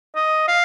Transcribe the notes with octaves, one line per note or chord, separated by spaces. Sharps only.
D#5
F5